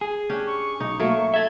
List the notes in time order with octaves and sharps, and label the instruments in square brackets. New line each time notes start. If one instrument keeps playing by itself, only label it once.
[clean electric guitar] G#4
[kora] C#4 D4 G4
[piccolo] C#6
[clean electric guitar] B1 [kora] D#4
[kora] F#3 A3 A#3
[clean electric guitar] A4 E5 [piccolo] G#6